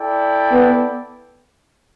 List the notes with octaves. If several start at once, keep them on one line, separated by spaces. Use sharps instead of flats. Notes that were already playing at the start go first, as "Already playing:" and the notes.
Already playing: E4 A4 D5 G5
B3